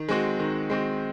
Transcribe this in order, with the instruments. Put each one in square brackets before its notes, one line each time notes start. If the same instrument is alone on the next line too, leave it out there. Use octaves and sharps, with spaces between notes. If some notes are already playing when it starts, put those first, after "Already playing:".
Already playing: [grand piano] D#3
G#3 C4 F#4
D#3
G#3 C4 F#4